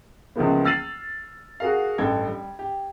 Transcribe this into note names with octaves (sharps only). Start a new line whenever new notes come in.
C#2 C#3 E3 F3 A#3 B3
E6 F6 A6 C7 D#7 F#7
F#4 G#4 A#4 F5
A1 G2 A4 G5 G#6
G3
G4